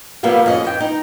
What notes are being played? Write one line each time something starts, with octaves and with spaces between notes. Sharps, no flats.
C3 F3 G3 A#3 B3
F2 C#4 D#5
E3 G5
D#4